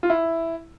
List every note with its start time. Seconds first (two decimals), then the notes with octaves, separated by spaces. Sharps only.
0.03 F4
0.10 E4